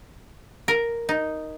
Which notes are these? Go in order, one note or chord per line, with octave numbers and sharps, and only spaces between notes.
A#4
D#4